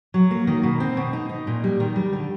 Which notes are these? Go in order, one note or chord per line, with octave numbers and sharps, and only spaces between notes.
F#3
A#3
D#3
B2
C4
B2
D#4
D#4
A#2
G3
D#3
G3
D3